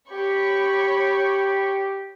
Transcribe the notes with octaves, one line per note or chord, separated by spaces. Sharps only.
G4 C#5 B5 C#6